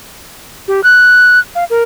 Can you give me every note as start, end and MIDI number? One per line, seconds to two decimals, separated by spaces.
0.68 0.81 67
0.84 1.39 90
1.55 1.64 77
1.70 1.83 70